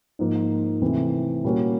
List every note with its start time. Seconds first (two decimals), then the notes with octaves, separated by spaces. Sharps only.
0.19 G#2 F3 A#3
0.82 C3 E3 A3 C4
1.44 A#2 G3 A#3 C#4 F#4